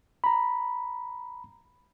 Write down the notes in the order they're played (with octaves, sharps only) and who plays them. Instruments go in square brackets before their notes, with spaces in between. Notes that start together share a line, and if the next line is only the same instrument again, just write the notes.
[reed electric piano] A#5 B5